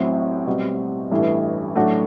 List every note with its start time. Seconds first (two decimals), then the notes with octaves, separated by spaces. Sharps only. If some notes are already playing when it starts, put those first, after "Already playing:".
Already playing: A1 A2 F#3 C4 E4
0.47 B2 G3 C4 F#4
1.11 A1 G2 E3 A3 E4
1.75 A2 F#3 A3 D4 F#4